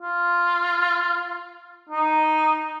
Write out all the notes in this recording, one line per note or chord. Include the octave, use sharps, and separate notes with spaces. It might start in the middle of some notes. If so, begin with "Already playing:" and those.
F4
D#4